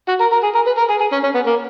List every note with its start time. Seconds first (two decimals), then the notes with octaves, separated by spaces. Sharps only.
0.08 F#4
0.20 A#4
0.32 A#4
0.43 G#4
0.55 A#4
0.67 B4
0.77 A#4
0.89 G#4
1.00 G#4
1.12 C#4
1.24 C#4
1.34 B3
1.46 A#3